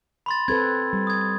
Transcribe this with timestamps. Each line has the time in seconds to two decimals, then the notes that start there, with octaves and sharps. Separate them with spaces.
0.26 B5 C6 A6
0.48 C4 A4 B4 G#6
0.93 G3
1.07 D#6 G#6